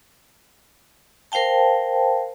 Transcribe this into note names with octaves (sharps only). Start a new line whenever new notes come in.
A#4 C5 F5 G5 A5